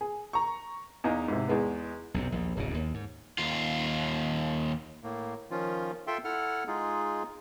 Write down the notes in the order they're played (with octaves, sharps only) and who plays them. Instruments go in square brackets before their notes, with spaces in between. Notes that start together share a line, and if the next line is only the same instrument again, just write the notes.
[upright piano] G#4
A#5 C#6
E2 D#4 F5
G#2 C3
E2 G#3 B3
[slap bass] B1 F#2 C3
A#1 D#2
D1 B1 F#2 C#3
D#2
G#2
[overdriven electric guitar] D#2 F4
[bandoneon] A2 A#3
D#3 F3 C#4 F4
F4 A4 E5 G5 C6
E4 A4 F#5 F6
G#3 D#4 F4 G#4